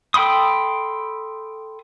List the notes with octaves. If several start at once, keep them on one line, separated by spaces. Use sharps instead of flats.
A4 G5 B5 C6 D#6